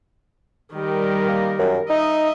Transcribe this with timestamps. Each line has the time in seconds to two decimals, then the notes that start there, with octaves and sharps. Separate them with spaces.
0.74 D#3 G3 G4 A#4
1.28 A#3
1.59 F#2
1.90 D#4 D#5 E5